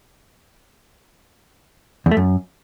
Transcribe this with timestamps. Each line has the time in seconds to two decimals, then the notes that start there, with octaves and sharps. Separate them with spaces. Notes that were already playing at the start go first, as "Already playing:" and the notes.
2.06 E2
2.11 A3
2.17 F#2